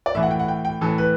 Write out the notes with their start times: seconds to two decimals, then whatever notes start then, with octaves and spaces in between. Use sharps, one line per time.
0.06 D5
0.15 A2 E3 E5
0.23 F#5
0.31 G5
0.39 F#5
0.48 G5
0.65 G5
0.81 A2 E3 A4
0.98 B4